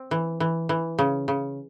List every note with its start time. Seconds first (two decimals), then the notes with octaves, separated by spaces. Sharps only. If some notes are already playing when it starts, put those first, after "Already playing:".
Already playing: C4
0.11 E3
0.40 E3
0.69 E3
0.99 C#3
1.28 C#3